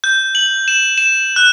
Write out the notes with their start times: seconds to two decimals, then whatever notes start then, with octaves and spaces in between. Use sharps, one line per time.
0.04 G6
0.35 F#7
0.68 E7
0.98 E7
1.36 F#6